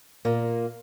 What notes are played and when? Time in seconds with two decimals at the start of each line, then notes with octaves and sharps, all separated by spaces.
0.25 A#2 A#3